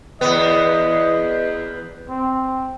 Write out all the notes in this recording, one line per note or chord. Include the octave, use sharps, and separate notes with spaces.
E2 B3 D#5
C4